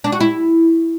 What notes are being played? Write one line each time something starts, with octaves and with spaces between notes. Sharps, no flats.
D4
F#4
E4